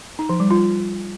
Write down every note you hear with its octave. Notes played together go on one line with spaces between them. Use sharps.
D#4
F3
G3
F4